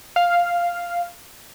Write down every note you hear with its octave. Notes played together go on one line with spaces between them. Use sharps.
F5